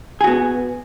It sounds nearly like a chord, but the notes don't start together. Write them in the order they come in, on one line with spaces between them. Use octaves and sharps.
G#4 F#4 B3